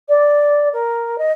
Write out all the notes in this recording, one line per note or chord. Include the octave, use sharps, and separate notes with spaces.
D5
A#4
D#5